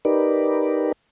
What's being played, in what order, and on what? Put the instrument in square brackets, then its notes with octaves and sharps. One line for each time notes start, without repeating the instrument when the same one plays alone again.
[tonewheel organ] D#4 G4 A#4 B4 D5